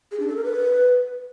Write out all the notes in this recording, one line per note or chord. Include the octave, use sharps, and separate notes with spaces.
G#4
D4
A4
A#4
B4